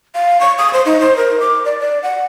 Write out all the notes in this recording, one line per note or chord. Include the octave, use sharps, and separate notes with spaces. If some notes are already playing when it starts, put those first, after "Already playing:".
F5
C#6
D#6
C5
D#4
C5
A#4
D6
D5
D5
F#5